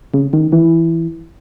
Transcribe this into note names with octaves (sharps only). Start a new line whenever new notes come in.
C#3
D#3
E3